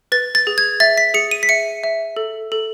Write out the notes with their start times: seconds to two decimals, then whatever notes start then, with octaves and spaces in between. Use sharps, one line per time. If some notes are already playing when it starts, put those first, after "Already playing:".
0.12 B4 A6
0.35 A6
0.47 G#4
0.58 G#6
0.80 E5 A6
0.98 B6
1.14 G#4 C#7
1.31 D#7
1.43 B6
1.49 E5 C#7
1.83 E5
2.17 A4
2.52 A4